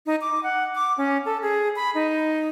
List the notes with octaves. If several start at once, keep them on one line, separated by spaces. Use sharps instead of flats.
D#4
D6
F#5
D6
C#4
A4
G#4
B5
D#4